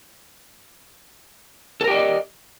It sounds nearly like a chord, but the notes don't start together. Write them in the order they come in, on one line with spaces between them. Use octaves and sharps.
A4 A#4 G4 D5 D#5